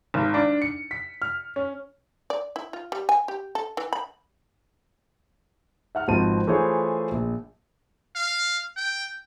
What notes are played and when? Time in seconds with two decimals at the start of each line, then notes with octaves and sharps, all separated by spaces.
0.14 G#1
0.34 D4
0.62 C#7
0.91 B6
1.22 F6
1.56 C#4
2.30 D5
2.56 E4
2.73 F4
2.92 G3
3.09 G#5
3.28 G4
3.55 A4
3.77 E3
3.93 B5
5.95 E5 F#5 F6
6.08 G#1 B2 F3 C4 A5 D#7
6.47 E3 A3 F4 G#4 C5 C#5
7.12 A#1
8.16 F5
8.76 G5